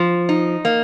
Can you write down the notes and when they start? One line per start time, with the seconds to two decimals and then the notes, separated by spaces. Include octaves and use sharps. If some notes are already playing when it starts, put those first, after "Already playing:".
Already playing: F3
0.29 D#4
0.65 A#3